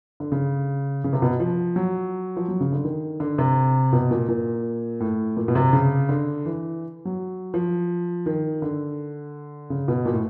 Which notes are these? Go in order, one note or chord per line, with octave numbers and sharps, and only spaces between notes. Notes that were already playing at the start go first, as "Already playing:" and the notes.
D3
C#3
C#3
C3
B2
F3
F#3
F3
F#3
C#3
D3
D#3
D3
C3
B2
A#2
A#2
A2
A#2
B2
C3
C#3
D3
E3
F#3
F3
D#3
D3
C#3
B2
A#2
A2